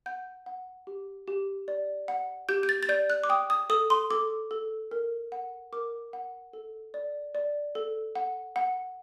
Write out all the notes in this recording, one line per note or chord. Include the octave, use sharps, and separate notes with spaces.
F#5 G6
F#5
G4
G4
D5
F#5
G4 G6
G6
A6
A6
D5 G6
F#6
D6
G5 D#6
D#6
A4 D#6
C6
A4 D6
A4
A#4
F#5
A#4 D6
F#5
A4
D5
D5
A4
F#5
F#5